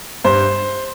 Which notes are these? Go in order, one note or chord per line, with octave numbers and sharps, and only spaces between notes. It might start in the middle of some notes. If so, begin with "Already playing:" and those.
G2 C5